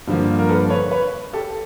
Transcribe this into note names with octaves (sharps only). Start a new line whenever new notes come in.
G2 D3 F3 A#3
A#4
A4 B4
B4 C#5
B4 C#5
G4 A4